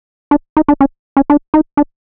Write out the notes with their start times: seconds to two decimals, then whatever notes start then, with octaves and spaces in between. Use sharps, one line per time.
0.31 D4
0.57 D#4
0.68 D4
0.81 C#4
1.17 C#4
1.30 D4
1.54 D#4
1.77 D4